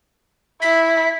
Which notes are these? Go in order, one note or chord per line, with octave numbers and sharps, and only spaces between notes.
E4 B6